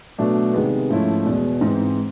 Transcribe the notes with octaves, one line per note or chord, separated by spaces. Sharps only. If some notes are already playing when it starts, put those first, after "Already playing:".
B2 F#3 A3 D4
C3 D#3 G#3 B3
G#2 F3 A3 C#4 E4
E2 B2 G#3
G#2 E3 G#3 C4 D#4